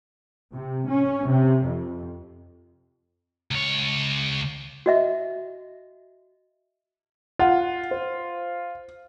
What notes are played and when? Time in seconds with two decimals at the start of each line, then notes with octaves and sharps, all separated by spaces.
0.54 C3
0.89 C#4
1.28 C3
1.65 F2
3.51 C#2 C#5
4.86 F#4 D#5 E5
7.39 F4 F#5
7.91 C5